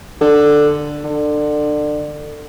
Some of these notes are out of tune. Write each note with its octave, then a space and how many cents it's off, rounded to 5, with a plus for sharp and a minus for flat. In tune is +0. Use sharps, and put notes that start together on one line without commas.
D3 +5
D3 +25